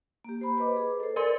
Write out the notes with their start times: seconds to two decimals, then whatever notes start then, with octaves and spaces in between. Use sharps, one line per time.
0.24 A#3 G4
0.41 C5 B5
0.58 B4 D#5 D6
0.76 G#4
1.00 A4 C5
1.16 A#4 D5 C6